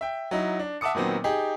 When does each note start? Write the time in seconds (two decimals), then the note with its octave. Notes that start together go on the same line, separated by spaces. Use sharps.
0.01 E5 G5
0.31 F#3 D#4 E4
0.59 D4
0.81 E5 F#5 A5 D6 D#6 C#7
0.95 A#2 D#3 F#3 B3 C4
1.24 D#4 G4 G#4